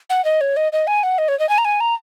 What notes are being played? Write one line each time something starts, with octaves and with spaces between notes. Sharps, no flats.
F#5
D#5
C#5
D#5
D#5
G#5
F#5
D#5
C#5
D#5
G#5
A#5
G#5
A#5